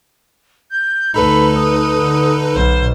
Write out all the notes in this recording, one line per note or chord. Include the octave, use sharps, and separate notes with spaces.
G6
D2 D#4 A4 B4 B5
D#6
D3
B1 B2 C5